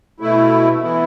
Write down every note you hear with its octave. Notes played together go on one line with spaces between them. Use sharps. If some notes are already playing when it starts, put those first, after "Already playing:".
B2 A3 E4
E3 B3 E4